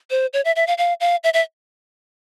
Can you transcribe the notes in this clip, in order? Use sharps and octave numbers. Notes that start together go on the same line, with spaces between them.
C5
C#5
E5
E5
F5
F5
F5
E5
E5